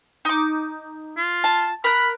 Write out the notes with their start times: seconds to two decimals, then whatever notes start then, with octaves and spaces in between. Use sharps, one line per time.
0.25 D#4 D6
1.17 F4
1.44 A5
1.84 A#4 B5 F#6